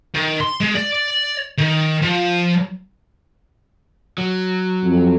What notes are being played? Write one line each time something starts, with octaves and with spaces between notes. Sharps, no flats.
D#3
C6
G#3
D5
D#3
F3
F#3
F2